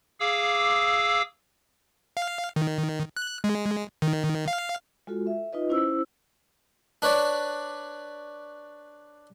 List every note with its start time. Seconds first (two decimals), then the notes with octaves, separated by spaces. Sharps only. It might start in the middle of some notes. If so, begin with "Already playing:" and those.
0.20 G#4 F5 D6 E6
2.17 F5
2.56 D#3
3.17 F#6
3.44 G#3
4.02 D#3
4.48 F5
5.07 G#3 F4 F#4 A4
5.27 E5
5.53 D#4 F4 B4 D#5
5.69 C#4 E4 C5 E6
7.02 D4 B4 C#5 D5